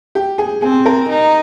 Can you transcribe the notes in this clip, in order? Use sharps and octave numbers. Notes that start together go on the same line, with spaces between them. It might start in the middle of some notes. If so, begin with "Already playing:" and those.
G4
G#4
C4 G#4
A#4
D#4